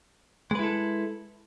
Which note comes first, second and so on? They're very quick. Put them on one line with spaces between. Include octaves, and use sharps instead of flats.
G#3 B4 E4 A4